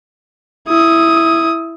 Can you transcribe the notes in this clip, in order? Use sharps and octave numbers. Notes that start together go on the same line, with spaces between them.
E4 D#6